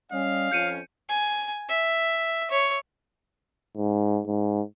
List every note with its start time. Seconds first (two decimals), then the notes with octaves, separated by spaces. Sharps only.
0.12 G3 C#4 D#5 F5
0.51 F2 F3 C#4 G6 C#7 D#7
1.09 G#5
1.69 E5
2.51 C#5
3.76 G#2
4.27 G#2